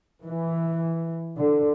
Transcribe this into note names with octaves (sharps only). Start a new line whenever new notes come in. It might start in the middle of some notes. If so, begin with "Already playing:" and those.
E3
D3